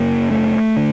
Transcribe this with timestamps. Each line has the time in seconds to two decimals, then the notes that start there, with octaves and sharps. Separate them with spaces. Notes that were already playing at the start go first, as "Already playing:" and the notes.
Already playing: F#2 C#3 A#3
0.31 A3
0.76 D3